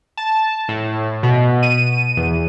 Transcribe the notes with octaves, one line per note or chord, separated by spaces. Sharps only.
A5
A2
B2
D#7
E2